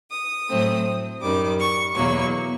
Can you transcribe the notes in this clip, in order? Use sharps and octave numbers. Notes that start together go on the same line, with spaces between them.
D#6
A2 F#3 A3 C4
F#2 D#3 G3 D6
C#6
E2 B2 F#3 A#3 C#6